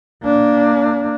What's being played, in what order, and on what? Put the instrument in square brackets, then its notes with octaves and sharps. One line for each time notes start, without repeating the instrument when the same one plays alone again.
[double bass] A#3 D4